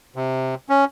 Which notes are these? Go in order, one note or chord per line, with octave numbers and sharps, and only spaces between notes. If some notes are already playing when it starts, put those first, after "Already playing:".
C3
C#4